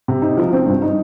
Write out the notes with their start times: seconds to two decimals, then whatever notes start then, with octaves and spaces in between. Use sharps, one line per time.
0.08 C3
0.22 D#4
0.37 F3
0.53 C4
0.66 G2
0.82 D#4